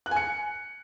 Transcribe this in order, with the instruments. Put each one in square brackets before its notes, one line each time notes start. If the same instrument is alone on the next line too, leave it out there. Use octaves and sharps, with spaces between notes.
[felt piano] F#6
G#5
C#7